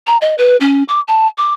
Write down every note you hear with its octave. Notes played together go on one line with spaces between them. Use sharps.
A#5
D#5
B4
C#4
D6
A5
D6